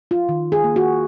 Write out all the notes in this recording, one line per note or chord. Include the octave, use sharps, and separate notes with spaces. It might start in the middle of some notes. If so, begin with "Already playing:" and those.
F4
D#3
G#4
A#3
F#4